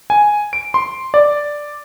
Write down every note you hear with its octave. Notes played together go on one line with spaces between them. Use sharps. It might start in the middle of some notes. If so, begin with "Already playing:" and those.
G#5
D7
C6
D5